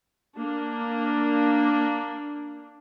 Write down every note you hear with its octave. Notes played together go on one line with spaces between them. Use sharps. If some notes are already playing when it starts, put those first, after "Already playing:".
A#3 D4